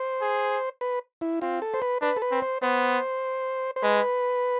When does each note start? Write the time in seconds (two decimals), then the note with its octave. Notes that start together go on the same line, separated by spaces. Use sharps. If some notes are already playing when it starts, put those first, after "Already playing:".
Already playing: C5
0.21 G#4
0.81 B4
1.21 E4
1.42 C4 F4
1.62 A4
1.74 C5
1.82 B4
2.01 D4 B4
2.17 A4
2.22 B4
2.31 C4
2.42 C5
2.62 B3 C5
3.76 C5
3.83 G#3 B4